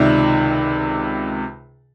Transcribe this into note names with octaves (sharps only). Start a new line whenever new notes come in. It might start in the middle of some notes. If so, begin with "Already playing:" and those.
Already playing: C#2 C3 D#3 D5 E5